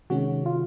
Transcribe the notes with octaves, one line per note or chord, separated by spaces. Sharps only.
C3 D#3 G#3 C#4 F#4
F4